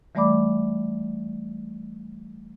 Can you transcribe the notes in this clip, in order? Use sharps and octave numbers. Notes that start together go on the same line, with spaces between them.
E3 G3 A3 D5 B5 D6